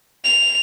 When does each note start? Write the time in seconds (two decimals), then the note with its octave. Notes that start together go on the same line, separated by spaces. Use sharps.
0.24 F7